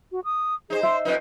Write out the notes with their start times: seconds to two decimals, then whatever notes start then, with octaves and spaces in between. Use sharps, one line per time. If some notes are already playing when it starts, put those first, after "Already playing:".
0.12 F#4
0.25 D#6
0.70 D#4 G#4 C5
0.83 E5 C6
1.05 F2 F3 D#4 B4